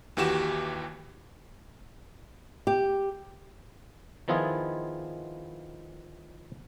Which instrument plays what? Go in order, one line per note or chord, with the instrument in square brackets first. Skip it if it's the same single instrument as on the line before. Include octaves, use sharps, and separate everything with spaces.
[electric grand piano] D#2 E3 F#4 G4 E7
[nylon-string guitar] G4
[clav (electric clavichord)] D#3 F3 B3 E4 F4 G#4